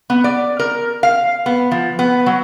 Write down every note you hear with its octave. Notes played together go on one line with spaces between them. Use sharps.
B3
D5
A#4
F5
B3
F3
B3
F#3